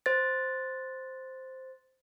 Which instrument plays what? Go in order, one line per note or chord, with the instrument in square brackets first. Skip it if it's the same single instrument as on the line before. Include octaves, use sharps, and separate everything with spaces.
[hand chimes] C5 A6